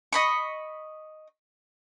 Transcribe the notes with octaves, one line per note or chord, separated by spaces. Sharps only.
D#5 B5 C#6